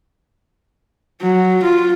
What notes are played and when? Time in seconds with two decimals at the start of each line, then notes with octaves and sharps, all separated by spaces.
1.22 F#3
1.63 F4